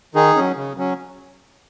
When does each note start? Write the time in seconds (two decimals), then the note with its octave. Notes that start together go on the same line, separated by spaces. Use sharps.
0.15 D#3 D#4 G#4
0.36 F#3 C#4
0.56 C#3
0.77 F#3 C#4